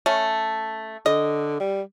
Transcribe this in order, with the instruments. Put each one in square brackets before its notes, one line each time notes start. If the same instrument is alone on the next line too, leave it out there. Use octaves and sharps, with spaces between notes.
[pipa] A3 C#4
[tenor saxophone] D3 [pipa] D#5
[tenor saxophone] G3